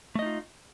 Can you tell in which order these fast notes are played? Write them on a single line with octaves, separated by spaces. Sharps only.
A3 D#5 D#4 F4